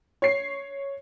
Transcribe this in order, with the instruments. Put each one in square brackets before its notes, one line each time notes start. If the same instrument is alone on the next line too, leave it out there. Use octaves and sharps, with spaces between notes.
[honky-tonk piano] C#5 C7